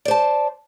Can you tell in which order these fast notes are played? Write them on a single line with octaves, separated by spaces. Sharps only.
D5 C5 A5